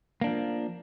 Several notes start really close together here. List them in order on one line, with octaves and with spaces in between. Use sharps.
A#3 D4 F3